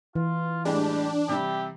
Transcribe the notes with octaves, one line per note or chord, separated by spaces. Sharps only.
E3 F4
A2 G3 G#3 D4 G4
C3 G3 E4 G4